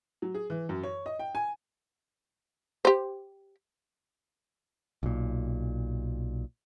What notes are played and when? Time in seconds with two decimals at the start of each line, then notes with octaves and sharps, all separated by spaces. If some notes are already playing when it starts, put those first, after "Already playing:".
0.22 F#3
0.34 G#4
0.50 E3
0.69 F#2
0.83 C#5
1.06 D#5
1.19 G5
1.35 G#5
2.85 G4 C5
5.03 B1 A#2